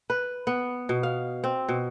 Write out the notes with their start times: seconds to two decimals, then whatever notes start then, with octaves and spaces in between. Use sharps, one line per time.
0.10 B4
0.47 B3
0.89 B2
1.03 F5
1.44 C4
1.69 B2